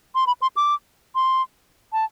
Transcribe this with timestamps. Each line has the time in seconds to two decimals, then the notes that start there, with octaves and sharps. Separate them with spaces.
0.15 C6
0.27 B5
0.42 C6
0.57 D6
1.15 C6
1.93 A5